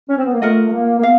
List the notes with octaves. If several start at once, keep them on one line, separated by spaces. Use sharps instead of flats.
C#4
C4
B3
A#3
A3 F4 A#4 D#5 F#5
A3
A#3
A#3
B3 F5